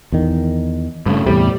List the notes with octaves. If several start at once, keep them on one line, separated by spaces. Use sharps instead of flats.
E2 D#3
G2 C#3 A3
E2 A2 C3 G3